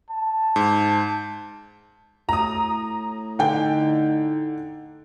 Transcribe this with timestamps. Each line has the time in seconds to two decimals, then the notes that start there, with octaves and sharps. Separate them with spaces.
0.10 A5
0.56 G#2
2.29 A2 A#5 D#6
3.39 D3 D#4 G5